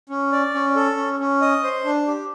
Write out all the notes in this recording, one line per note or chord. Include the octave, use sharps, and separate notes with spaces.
C#4
D5
C#4
A4
C#4
C#4
D#5
C5
D4
G4